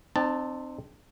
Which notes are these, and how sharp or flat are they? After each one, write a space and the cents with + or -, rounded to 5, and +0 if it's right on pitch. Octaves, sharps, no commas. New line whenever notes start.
C4 +0 D#4 -40 A5 +0